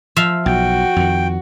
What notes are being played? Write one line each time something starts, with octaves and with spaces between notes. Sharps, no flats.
F3 E5 F5
B1 F#4 G5
F2 D#3